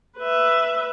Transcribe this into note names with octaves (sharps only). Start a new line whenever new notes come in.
B4 E5